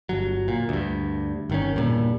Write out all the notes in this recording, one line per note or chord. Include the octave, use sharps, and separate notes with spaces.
G1 F#3
A#2
D2 G2
G1 D#3 C#4
E2 G2 A#2